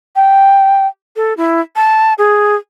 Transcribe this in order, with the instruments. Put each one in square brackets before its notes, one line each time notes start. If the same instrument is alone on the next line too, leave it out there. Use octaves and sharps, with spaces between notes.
[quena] G5
A4
E4
A5
G#4